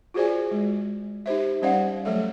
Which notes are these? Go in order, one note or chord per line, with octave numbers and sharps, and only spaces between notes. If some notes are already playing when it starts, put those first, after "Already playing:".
F4 F#4 G#4 C5 D5 G#5
G#3
D#4 G4 C5 E5
G3 C#4 C5 D5 F5 F#5
F#3 A3 A4 E5